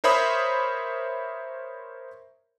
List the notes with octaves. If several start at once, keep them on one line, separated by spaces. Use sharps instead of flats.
A#4 C5 C#5 E5 B5 D#6